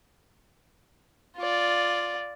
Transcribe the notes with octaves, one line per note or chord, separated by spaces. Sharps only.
F4 D5